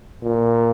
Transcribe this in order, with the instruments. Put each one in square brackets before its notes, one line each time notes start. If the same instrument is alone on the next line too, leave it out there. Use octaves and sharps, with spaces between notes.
[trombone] A#2